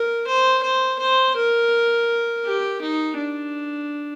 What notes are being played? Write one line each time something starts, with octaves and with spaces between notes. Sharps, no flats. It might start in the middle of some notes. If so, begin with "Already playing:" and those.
Already playing: A#4
C5
C5
C5
A#4
G4
D#4
D4